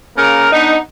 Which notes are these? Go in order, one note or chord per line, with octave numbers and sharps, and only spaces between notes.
C#3 A#3 A#4
B3 D4 D#4